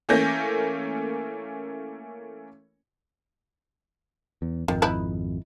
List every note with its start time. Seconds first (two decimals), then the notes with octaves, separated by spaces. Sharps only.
0.09 E3 A3 A#3 C#4 G6 A#6
4.42 E2
4.68 G#1 F2 D#3
4.82 D#4 E4 B4